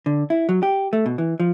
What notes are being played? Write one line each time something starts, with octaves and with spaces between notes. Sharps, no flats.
D3
E4
F#3
G4
A3
B2
E3
F3